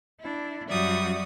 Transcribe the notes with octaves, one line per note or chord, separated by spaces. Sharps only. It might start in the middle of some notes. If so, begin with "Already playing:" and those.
D4 E4
F#2 G3 F#4 D5 E5 D#6